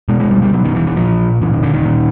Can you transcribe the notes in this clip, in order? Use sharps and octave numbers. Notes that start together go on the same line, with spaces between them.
B2 G#3
G#3
G3
G3
B2 F#3
D#3
E3
E3
A#2 F3
A#2 E3
D#3
D3
D#3
A#2